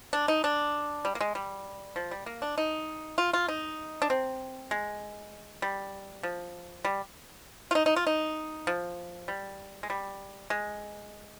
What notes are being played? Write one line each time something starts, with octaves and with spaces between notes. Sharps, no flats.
D4
D#4
D4
G3
A#3
G#3
G3
F3
G3
A#3
D4
D#4
F4
F4
D#4
D4
C4
G#3
G3
F3
G3
F4
D#4
D#4
F4
D#4
F3
G3
G#3
G3
G#3